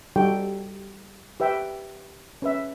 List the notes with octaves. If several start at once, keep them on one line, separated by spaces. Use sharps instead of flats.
G3 D#4 F#4 G4 A4 G5
G4 B4 E5 G5
C#4 B4 E5